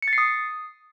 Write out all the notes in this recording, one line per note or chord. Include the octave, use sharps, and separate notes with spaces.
C#7
A6
C7
D#6